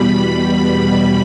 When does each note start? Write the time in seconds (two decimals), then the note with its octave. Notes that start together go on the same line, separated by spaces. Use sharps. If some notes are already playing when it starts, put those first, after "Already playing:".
Already playing: E2 B2 G3 B5